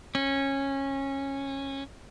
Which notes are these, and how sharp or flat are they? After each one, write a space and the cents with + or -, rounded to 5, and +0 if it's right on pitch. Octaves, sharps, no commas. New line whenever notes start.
C#4 -15